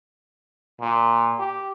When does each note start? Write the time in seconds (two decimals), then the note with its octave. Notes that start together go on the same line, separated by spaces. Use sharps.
0.80 A#2
1.39 G4